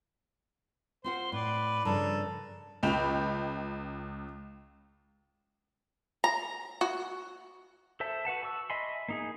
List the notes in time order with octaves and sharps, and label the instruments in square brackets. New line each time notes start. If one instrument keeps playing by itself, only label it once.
[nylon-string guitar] C4 F4 F#5 [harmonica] C5
[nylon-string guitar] A2 [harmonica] B4 D5
[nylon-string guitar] G2 C#3 F3 [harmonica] A4 A#4
[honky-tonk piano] C#2 G5 B5 F7
[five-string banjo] A#5
F#4
[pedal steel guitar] A4 C5 E5 A5
F#4 B4 F#5 A5
A5 C#6 E6
D#5 E5 G#5 B5 C6
A#3 D#4 G#4